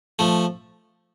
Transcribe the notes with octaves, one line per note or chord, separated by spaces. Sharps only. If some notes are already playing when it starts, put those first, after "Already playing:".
F3 A3